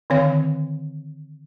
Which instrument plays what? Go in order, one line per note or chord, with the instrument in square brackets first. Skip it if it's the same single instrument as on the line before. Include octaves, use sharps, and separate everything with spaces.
[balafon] D3 D#3 C4 C#5 F5